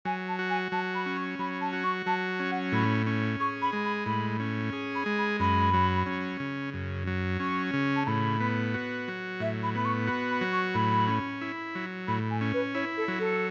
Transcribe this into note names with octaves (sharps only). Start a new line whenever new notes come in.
F#3 G#5
A5
F#4
G#5
F#3 A5
B5
C#4
C#6
F#3 B5
A5
F#4
C#6
F#3 A5
C#4
F#5
A2 B5
C#4
G#4 C#6
B5
G#3
B5
A2 B5
C#4
G#4
B5
G#3
B5
F#2 B5
F#3
C#4
C#3
F#2
F#3
C#4 C#6
C#3
A5
A2 B5
B3
F#4
F#3
A2 E5
B5
B3 B5
C#6
F#4 B5
B5
F#3
C#6
A2 B5
C#4
E4
F#3
A2 B5
G#5
C#4
B4
E4 C#5
A4
F#3
A4